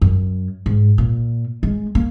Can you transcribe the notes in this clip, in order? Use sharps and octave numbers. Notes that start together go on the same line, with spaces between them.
F#2
G#2
A#2
G#3
A#3